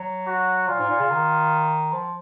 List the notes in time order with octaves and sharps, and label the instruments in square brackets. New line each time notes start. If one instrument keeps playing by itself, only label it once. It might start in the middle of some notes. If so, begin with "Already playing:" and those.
Already playing: [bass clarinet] F#3
[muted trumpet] F#4
[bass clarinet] A#2 [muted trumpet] F4
[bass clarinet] G#2
A#2
C#3
D#3
F3